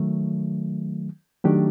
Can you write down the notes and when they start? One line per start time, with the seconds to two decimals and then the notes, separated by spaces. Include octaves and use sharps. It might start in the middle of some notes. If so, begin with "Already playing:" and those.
Already playing: D#3 F#3 A3
1.44 D#3 F#3 A3 D4 G4